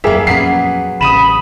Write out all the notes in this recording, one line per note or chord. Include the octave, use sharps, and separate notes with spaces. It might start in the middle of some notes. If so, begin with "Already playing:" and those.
D#1 F#2 G3 A#3 G#4 A#4 E5
F2 A#2 F#3 B3 C#4 G#4 B6 C7
A1 C#3 B5 D#6 D#7 E7